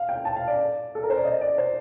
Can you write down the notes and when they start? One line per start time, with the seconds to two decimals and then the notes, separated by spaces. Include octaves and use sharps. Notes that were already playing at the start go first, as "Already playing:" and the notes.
Already playing: F5
0.09 G5
0.25 A5
0.36 F5
0.48 D5
0.95 A4
1.03 A#4
1.10 C5
1.17 D5
1.25 D#5
1.41 D5
1.58 C5